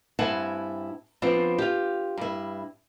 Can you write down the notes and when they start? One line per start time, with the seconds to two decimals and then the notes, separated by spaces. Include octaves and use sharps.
0.19 G2 C4 E4 F#5 G#5 A5
1.22 F3 B3 C4 D4 F4
1.58 F4 G4
2.18 G2 E4